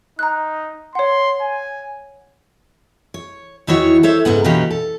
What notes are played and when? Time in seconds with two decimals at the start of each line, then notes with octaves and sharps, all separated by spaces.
0.19 D#4 A#5 F#6
0.95 C#5 F#5 C6
1.41 G#5
3.14 C#5
3.67 E2 D#3 E4 F#4 C#5
4.03 A4 C5 C#5 E5
4.25 G#2 C#3 B3 F#5
4.44 B2 D#3 E3 A#3 C#4 G4
4.70 A4